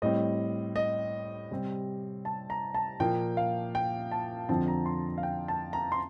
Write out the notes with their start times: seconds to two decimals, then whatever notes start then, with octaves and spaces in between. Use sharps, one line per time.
0.02 A2 G3 C4 D#5
0.76 D#5
1.51 C3 G3 C4
2.25 A5
2.50 A#5
2.74 A5
3.00 A#2 F3 A#3 G5
3.37 F5
3.75 G5
4.11 A5
4.49 F2 D3 F3 C4 A5
4.68 A#5
4.86 C6
5.18 F5
5.23 G5
5.48 A5
5.73 A#5
5.92 C6